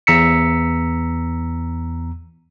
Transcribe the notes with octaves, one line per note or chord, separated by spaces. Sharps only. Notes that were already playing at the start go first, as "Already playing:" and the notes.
E2 A#5 E6 B6 C#7